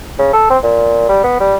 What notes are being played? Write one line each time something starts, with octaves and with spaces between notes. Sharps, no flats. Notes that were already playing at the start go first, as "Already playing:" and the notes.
C#3
A4
C4
A#2
G3
B3
G3